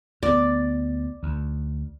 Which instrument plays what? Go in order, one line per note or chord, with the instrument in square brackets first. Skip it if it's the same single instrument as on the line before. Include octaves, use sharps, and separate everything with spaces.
[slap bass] D2 B3 [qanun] D5
[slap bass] D2